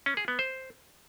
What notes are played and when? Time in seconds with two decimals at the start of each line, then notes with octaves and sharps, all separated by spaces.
0.06 C#4
0.17 G#4
0.28 B3
0.39 C5